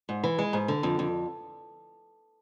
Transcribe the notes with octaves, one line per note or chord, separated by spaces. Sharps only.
G#2
E3
G#3
G#2
D3
F2
F2